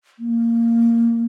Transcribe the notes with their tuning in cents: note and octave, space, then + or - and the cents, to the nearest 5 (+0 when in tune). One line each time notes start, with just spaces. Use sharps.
A#3 -10